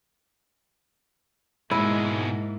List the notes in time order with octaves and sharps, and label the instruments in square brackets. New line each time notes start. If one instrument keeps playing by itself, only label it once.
[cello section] G#2 A#3 [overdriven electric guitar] B2 G#3 [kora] E4